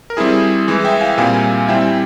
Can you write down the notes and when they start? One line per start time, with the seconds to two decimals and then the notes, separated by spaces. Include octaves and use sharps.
0.10 A#4
0.17 G3 C4 E4 G#4
0.67 E3 G#3 E4 G#4
0.85 E5 G5
1.01 F5 G#5
1.17 A#2 G3 C4 F5 G#5
1.68 G3 C4 E4 E5 G5